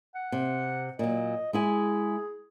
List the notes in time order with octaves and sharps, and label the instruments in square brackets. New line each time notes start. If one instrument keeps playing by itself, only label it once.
[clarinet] F#5
[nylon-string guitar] C3
[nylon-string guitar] A#2 F#3 [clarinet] D#5
[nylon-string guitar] G#3 E4 G#5 [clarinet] G#4